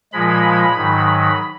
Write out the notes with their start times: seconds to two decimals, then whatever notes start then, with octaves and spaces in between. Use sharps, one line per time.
0.13 A#2 F3 G#3 B5
0.77 G#2 D#3 F#3